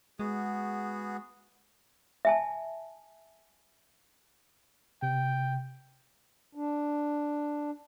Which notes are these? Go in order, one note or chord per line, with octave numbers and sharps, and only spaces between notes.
G#3 B3 F#4 G#4
E5 G#5 A5
C3 G5
D4